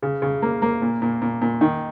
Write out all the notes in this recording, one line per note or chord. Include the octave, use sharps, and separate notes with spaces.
C#3
C#3
A#3
A#3
A#2
A#2
A#2
A#2
D#3